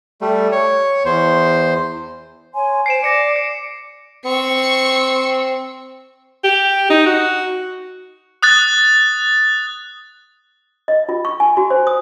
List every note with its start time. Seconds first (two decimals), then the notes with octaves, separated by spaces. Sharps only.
0.21 G3 A3
0.52 C#5
1.05 E2 C5
2.54 C#5 G#5 C6
2.86 C5 G#5 C7 D7 E7
3.03 D5 D6 A#6 C#7 D7
3.36 C#7
4.26 C4 C#6 C#7
6.44 G4
6.90 D#4
7.06 F#4
8.42 D#6 F#6 A6
10.88 D#5
11.09 F4
11.25 C#6
11.40 G#5
11.57 F#4
11.70 C5
11.87 D#6